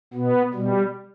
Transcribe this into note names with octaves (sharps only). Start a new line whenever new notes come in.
B2 B3
B2 G3